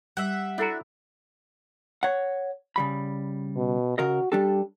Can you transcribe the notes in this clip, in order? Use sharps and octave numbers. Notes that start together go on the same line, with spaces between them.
G3 E5 F#5
D4 E4 F#4 A4 A#5
C#5 F#5
C#3 G3 B5
B2
C#3 F#4 A#4 D#5
G3 D4 G4 A4